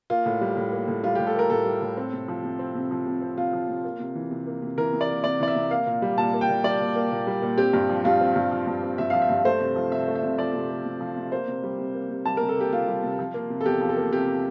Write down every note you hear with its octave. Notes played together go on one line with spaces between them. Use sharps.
A#3 F4
A2
G3
A2
A#3
A2
G3 F4
G4
A2
A4
A#3 A#4
A2 A4
G3
A2
C4
C3
F3
C3
C4
C3
F3
C3
C4
C3 F4
F3
C3
A#3
C3
E3
C3
A#3
C3
E3 A#4
C3
D5
A#3
C3 D5
E3 D5
E5
C3
A#3 F5
A#2
G3
A#2 A5
A#3
G5
A#2
G3 D5
A#2
A#3
A#2
G3
A#2
C4 G4
G2
F3
G2 F4
C4
G2
F3
G2
C4
G2 E5
F3 F5
E5
G2
A3 C5
C3
F3
C3 E5
A3
E5
C3
F3 D5
C3
A3
C3
F3
C3
A#3 C5
C3
G3
C3
A#3
C3
G3 A5
A#4
C3
A4
A#3 G4
C3 F4
G3
C3
F3
A#3
C3
A4
E2 G4
F3
A4
A#3
C3 G4